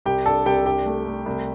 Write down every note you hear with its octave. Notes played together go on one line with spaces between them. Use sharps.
C2 G4 G5
D4 A4 A5
C2 G4 G5
D4 G4 G5
A3
A3
C2